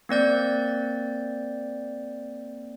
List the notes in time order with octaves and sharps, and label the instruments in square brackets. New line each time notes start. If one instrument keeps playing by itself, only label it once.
[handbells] A#3 C4 D5 G6